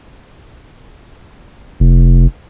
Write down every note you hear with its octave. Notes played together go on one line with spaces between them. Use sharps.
F1